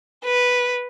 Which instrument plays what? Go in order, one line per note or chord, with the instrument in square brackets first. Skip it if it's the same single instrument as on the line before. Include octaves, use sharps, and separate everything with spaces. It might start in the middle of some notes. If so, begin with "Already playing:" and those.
[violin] B4